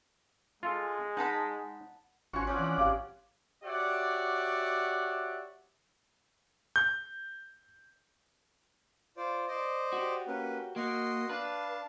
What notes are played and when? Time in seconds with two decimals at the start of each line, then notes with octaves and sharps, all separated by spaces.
0.63 G#3 F4 A4
1.17 D#4 F#5 A5 B5
2.33 G#1 C#4 F4 F#4 G#5 C#6
2.47 F3 C4 C#4 D5 F#5
2.59 E3
2.78 G#1 G4 F5 D6
3.64 F#4 G4 C#5 D5 E5 F#5
6.76 G6
9.17 F4 C5 D5
9.48 C5 D5 D#5
9.93 F#4 G4
10.27 A#3 C#4 B4
10.76 A#3 F#4 D#5 C6
11.29 D4 B4 F5 A5